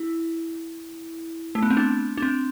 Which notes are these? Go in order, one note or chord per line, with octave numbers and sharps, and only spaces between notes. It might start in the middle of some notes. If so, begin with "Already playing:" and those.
Already playing: E4
A3
B3
C4
D4
D4
C4